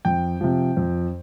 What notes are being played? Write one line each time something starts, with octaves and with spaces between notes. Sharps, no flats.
F2 G5
C3 F3
F2